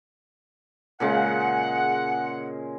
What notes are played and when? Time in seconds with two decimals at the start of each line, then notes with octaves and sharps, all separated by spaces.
1.00 A#2 C#3 G#3 F#5